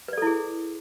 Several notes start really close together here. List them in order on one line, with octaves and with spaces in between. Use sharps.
B4 D5 A4 E4 G#4